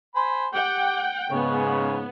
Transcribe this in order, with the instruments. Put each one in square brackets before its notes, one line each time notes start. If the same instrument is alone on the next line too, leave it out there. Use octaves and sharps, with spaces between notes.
[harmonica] C5 G#5 B5
[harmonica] G4 [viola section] F#5 G5
[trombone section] G#2 C#3 [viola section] B3 [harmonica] C#5